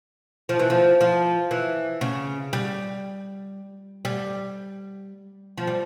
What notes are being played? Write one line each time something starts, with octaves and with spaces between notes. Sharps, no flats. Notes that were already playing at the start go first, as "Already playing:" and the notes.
F3
E3
F3
F3
E3
C#3
G3
G3
F3
G3